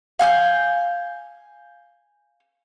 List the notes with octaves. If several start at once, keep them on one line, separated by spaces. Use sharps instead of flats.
F5 G#5 F6 G6